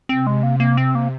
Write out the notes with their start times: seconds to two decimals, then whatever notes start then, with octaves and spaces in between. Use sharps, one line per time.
0.09 C3 C4
0.27 G#3
0.43 A#3
0.60 A#3
0.77 C4
0.95 A#3